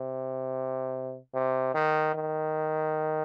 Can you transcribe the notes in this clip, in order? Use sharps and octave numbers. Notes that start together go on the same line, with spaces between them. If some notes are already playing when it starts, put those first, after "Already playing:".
Already playing: C3
C3
D#3
D#3